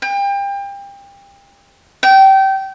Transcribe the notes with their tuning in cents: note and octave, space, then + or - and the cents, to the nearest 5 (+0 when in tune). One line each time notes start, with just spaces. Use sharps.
G5 +30
G5 -25